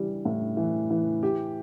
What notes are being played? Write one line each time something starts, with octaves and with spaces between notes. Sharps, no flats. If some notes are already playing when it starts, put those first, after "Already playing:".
Already playing: E3 G3
A2
E3
E3
G4